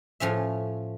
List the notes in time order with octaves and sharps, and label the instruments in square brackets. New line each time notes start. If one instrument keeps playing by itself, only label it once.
[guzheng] A2 F3 C#4 E5